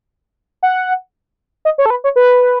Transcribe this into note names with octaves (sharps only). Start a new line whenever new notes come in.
F#5
D#5
C#5
A4
B4
C#5
B4